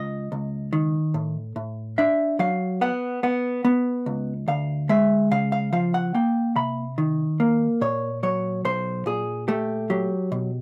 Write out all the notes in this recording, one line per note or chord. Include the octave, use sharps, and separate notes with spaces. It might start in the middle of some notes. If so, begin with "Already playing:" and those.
Already playing: C#2 D#5
C#2
D#3
A2
A2
D4 E5
F#3 F5
B3 F#5
B3 F#5
B3
C#2
D2 F5
G#3 E5
C#3 F5
F5
F3 F5
F#5
A#3 G5
C3 B5
D#3
A#3
A#2 C#5
F#3 C#5
B1 C5
A#2 G#4
A3 G4
F#3 G4
B2